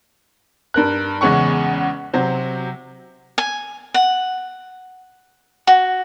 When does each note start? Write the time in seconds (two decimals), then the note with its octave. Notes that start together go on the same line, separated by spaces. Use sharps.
0.74 G2 A#4 F#6
1.21 E2 C#3 G#3 C#4 F#5 C#6
2.14 C3 F#3 C5
3.38 G#5
3.94 F#5
5.67 F#4